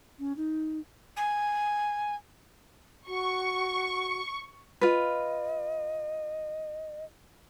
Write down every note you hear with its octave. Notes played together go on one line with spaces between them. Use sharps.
C#4
D#4
G#5
F#4 C#6
F4 B4 D#5